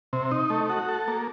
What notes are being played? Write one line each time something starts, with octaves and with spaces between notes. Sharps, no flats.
C3
D#4
A3
F#4
A4
A#3